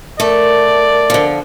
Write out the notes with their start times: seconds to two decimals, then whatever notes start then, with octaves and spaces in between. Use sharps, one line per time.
0.20 A3 A#4 D5
1.10 D3 F3